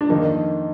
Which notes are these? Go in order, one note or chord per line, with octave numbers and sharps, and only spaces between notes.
D4
F2 D#3 A#3 D#4